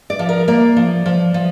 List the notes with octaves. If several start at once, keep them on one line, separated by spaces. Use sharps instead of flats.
D5
F3
A#4
A#3 D5
F3
F3
F3